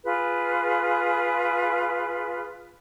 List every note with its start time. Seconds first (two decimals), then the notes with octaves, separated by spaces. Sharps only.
0.04 F4 G#4 B4